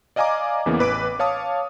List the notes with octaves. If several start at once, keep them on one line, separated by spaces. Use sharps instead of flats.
D5 D#5 F5 G#5 A#5 D6
E2 C#3 E3 A#3 B3
A1 B4 D6 D7
C#5 F5 A5 D#6